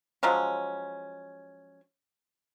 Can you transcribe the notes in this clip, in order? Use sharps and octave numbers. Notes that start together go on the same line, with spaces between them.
F3 F#3 G#3 C#4